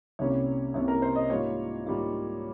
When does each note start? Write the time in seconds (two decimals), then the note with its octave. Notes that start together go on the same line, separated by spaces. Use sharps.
0.19 C2 C3 G3 A#3 C#4 C#5
0.74 C2 C3 G3 A#3 C#4 C#5
0.88 A#4
1.02 C5
1.15 D#5
1.30 G#2 G3 A#3 F4 C#5
1.86 G#2 G3 A#3 F4